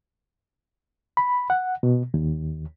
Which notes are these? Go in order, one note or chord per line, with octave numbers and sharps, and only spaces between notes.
B5
F#5
B2
D#2